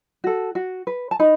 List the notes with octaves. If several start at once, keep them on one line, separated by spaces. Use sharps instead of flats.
F#4 A4
F#4
B4
A5
D#4 B5